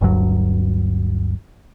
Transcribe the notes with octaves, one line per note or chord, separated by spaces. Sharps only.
G1 D2 G2 F#3